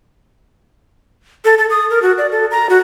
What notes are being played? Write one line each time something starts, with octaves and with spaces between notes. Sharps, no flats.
A4
A4
D#6
A#4
F#4
D5
A4
A#5
F#4